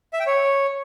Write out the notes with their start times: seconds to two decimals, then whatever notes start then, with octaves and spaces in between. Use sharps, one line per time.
0.13 E5
0.20 G5
0.26 C#5